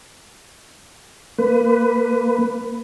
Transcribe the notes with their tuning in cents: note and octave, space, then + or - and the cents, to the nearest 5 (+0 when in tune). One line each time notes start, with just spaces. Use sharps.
A#3 +0 B4 +15